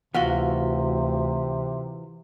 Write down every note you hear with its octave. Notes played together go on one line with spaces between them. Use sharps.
D2 C3 E3 F4 F#4 F5 F#5